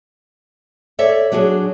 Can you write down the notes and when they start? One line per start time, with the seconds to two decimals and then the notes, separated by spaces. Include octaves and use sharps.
0.99 A4 C#5 D5 E5
1.32 F#3 D4 F#4 G#4